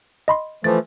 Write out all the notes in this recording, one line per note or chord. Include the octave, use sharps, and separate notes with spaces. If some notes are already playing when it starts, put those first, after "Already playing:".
D#5 B5 C6
E3 F3 A3 A6